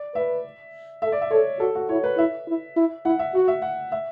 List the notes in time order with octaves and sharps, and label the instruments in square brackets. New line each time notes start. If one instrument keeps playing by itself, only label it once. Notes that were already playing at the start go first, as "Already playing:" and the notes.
Already playing: [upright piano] D5
[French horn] B4 [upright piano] E5
[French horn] A4 [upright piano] E5
[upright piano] D5
E5
[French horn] A4 [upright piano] C#5
[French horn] F#4 [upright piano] A4
[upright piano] F#4
[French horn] E4 [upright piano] C#5
[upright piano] B4
[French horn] E4 [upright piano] E5
[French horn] E4
E4
[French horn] E4 [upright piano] F#5
[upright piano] E5
[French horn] F#4 [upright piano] F#5
[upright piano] E5
F#5
E5